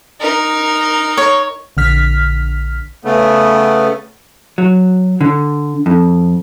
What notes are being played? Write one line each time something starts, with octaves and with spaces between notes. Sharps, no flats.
D#4 A#4
C#5
A#1 D3 F6 B6
C#3 A3 B3
F#3
D3
F2